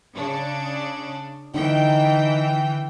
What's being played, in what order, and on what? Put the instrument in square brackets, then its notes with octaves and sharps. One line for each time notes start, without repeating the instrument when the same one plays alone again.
[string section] C#3 D4
[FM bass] D3 [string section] E3 G5 [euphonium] D#4